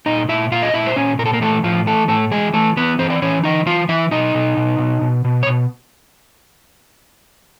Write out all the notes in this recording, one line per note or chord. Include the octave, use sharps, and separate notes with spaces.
A#2 D#4 D#5
A#2 E4 E5
A#2 F4 F5
D#5
A#2 E4 E5
C5
A#2 C#4 C#5
A#2 A#4
A4
A#3 A#4
E3 A3 A4
A2 F3 F4
E3 A3 A4
A2 A3 A4
E3 G#3 G#4
E3 A3 A4
E3 B3 B4
E3 C4 C5
D5
E3 C#4 C#5
E3 D#4 D#5
E3 F4 F5
E3 E4 E5
B2 D#4 D#5
B2
B2
B2
B2
B2
C#5
B2